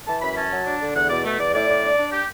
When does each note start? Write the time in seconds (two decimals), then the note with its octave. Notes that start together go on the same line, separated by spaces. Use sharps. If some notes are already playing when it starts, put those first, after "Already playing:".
0.07 E3 A5
0.22 F#2 B5
0.36 C#4 A5
0.51 F#3
0.66 D4
0.80 D3
0.95 E2 F#5
1.10 B2 D5
1.25 A3
1.39 E2 D5
1.54 A2 D5
1.69 A2
1.83 D4
1.97 D4
2.12 G4